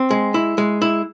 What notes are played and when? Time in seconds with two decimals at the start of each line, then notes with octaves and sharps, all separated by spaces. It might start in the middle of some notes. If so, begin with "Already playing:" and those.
Already playing: C4
0.11 G#3
0.34 E4
0.58 G#3
0.82 E4